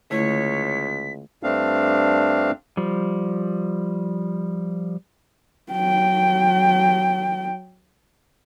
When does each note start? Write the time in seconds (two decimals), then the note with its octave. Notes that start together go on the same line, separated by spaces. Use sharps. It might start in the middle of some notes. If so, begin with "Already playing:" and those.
0.11 C#2 D3 A3 E4 C#5 B6
1.43 G2 A3 C4 D4 F5
2.77 F3 G3
5.72 F#3 G5